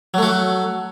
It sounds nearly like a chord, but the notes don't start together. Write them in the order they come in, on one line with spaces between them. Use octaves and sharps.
F#3 A3 F#4